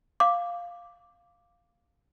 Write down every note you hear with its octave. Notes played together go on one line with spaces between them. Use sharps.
F5 D6